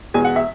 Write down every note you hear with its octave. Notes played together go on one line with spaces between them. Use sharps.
E2 B2 G#3 G#5
F#5
E5